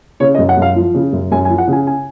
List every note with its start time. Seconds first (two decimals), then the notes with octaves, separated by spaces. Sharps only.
0.20 C#3 C#5
0.35 D#5
0.39 F#2
0.49 F#5
0.57 F#2 F5
0.75 F3
0.94 C#3
1.13 F#2
1.31 F#2 G#5
1.45 G#5
1.49 F3
1.58 F#5
1.68 C#3 G#5
1.87 G#5